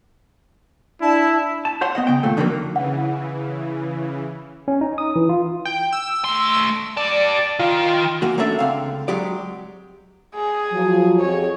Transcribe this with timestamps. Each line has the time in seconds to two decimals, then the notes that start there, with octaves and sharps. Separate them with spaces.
1.01 D4 E4 A5
1.65 A5
1.81 C5 C#5 F#5 C6
1.95 B3 D#5 F#5
2.07 C#3 G5
2.23 D#2 A#2 A3
2.37 F2 D3 D#3 F#3 G#3 A#3
2.76 C#3 E3 F#5
4.68 C#4
4.81 D#4
4.98 D#6
5.16 E3
5.29 F4
5.65 G5
5.92 E6
6.24 A3 C6
6.97 G4 D5 A5
7.59 D#3 F4
8.22 E3 A#3 F#4
8.38 A3 A#3 C#4 D4 E5
8.59 C#2 D3 C4 F5
9.08 F#3 G#3 G4 D5
10.35 G#4
10.73 F3 F#3
11.20 F2 G4 G#4 C#5